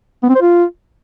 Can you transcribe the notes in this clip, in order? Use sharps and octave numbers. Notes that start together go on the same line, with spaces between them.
B3
C4
C5
F4